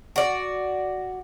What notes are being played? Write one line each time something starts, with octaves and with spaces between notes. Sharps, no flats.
F#4 D5